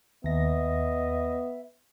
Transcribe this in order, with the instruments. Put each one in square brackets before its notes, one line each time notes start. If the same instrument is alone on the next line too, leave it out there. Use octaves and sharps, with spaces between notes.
[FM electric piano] D#2 A#6 [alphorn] B3 [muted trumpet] D#5 [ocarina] E5